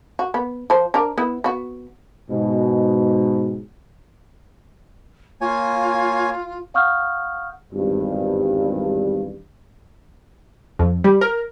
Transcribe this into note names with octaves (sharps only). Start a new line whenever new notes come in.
F#4
B3
F3 C5
D4 A#4
B3 E4
B3 F#4
G#2 B2
A#3 F4 C#5 G#5
F5 F#5 C#6 D#6 F6 G6
G#1 E2 G2
F2
G3
A#4